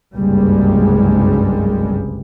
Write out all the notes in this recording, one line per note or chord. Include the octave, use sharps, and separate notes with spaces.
F#1 C2 G2 G3 G#3